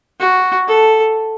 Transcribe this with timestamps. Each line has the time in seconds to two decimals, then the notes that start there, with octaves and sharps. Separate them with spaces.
0.20 F#4
0.68 A4